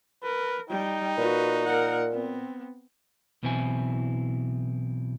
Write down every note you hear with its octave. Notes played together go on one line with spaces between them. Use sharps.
A#4 B4
G3 D#4 G5
A#2 F#4 B4
A#4 F#5
B3 C4
B1 B2 E3 C4 E4 G#5